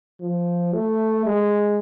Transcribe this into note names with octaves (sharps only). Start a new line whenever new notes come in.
F3
A3
G#3